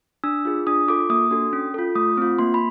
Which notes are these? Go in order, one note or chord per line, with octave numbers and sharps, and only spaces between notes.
D4 E6
F4 G#4
D4 D#6
F4 A4 D6
A#3 D#6
D4 F#4 A4
C#4
F4 A4
A3 D#6
C4 F4
A#3 C6
B5